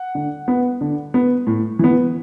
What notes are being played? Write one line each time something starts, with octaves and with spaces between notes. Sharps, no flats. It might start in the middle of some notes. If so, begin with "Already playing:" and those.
Already playing: F#5
D3
B3
D3
B3
A2
E3 B3